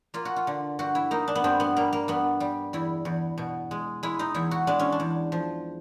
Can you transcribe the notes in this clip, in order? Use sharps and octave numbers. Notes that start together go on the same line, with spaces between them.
A#3 F4
F#4
F4
D3
G2 F#4
E4
A#3 D#4
D4
B3
G2 C4
B3
G3 A#3
A#3
G2 B3
G3
E2 E4
E2
B2
G#3
G#3 E4
D#4
E2 E4
F#4
G#3 D4
C#4
D4
E2
F3